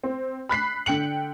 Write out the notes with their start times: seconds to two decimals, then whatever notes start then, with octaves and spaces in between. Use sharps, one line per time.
0.04 C4
0.49 B5 F#6 B6 C7
0.86 D3 G5 C#7 F#7